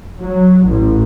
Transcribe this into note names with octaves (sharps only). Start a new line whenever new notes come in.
F#3
A1